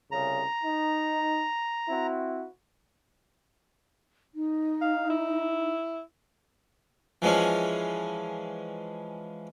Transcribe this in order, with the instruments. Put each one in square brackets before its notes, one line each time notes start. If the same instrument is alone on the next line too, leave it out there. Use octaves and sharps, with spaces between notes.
[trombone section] C2 C#3 [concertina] A#5
[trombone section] D#4
C4 E4 F#4
[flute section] D#4
[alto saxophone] F5
E4
[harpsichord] E3 F3 G#3 C#4